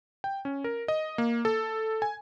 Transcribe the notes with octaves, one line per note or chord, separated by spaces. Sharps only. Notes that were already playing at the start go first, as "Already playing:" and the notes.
G5
C#4
A#4
D#5
A#3
A4
G#5